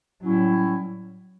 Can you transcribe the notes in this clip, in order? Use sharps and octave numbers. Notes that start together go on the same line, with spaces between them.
A2 F#3 G3 C#4 E4